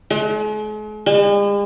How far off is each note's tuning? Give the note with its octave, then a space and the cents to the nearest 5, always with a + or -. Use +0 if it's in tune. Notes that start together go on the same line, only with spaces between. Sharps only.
G#3 +45
G#3 -45